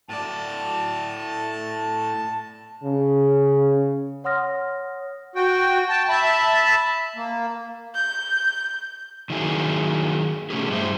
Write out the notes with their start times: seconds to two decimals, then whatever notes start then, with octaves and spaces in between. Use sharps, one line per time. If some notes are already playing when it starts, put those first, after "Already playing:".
0.09 A2 D5 A5
2.84 C#3
4.24 C#5 F#5 C6 D#6 F6 A#6
5.36 F#4 G5
5.89 G5 A5
6.09 E5 A5 B5
7.16 A#3
7.95 G6
9.30 D#3 F#3 A#3 E4 G#4
10.50 B2 A3 C#4 G4 G#4
10.69 G2 E4 C5